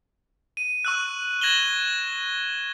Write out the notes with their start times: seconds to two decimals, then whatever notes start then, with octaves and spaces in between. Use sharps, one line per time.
0.57 D#7
0.85 C#6 E6 F#6
1.41 G#6 A#6 E7 F#7 G7